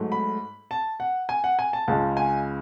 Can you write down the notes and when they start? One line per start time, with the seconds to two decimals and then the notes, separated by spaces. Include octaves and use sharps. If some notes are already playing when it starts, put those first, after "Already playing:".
Already playing: G#2 F#3 A3
0.12 B5
0.71 A5
1.00 F#5
1.29 G#5
1.44 F#5
1.59 G#5
1.73 A5
1.88 C#2 C#3 G#3 A5
2.17 G#5